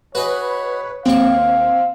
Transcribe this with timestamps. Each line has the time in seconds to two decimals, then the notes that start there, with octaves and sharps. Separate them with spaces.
0.15 F#4 G#4 B4 C#5 D#5
1.06 D#2 C4 F5 C#6